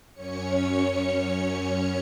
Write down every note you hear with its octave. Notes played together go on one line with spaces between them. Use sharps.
F#2 C#4 C#5 C#7